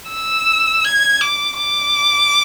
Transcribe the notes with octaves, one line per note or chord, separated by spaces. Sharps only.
E6
G#6
D6
D6